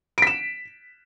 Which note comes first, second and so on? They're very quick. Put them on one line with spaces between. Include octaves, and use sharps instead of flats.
D7 B6 E7